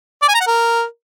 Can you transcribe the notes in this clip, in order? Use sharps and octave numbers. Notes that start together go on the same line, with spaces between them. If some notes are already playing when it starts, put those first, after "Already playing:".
D5
G#5
A#5
F#5
A#4